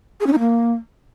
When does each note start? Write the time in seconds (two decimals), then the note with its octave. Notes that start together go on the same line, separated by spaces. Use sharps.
0.20 G#4
0.27 C#4
0.33 D#4
0.39 A#3